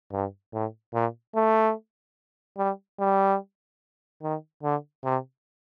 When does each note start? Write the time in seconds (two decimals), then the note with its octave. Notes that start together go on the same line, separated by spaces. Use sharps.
0.12 G2
0.53 A2
0.94 A#2
1.35 A3
2.58 G3
3.00 G3
4.22 D#3
4.63 D3
5.04 C3